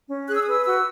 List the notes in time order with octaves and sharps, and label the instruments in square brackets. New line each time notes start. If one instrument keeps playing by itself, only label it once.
[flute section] C#4
G#4 F#6
E6
D#6
B4 E6
F#4 E6